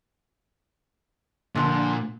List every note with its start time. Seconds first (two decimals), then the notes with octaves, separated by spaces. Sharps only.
1.55 A#2 D3 F3